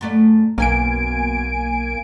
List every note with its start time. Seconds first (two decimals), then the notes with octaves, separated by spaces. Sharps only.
0.01 F#2 A3 D5
0.58 B1 F#2 B2 A#3 C#4 G#5 D7